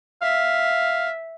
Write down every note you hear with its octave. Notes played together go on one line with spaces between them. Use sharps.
E5 F5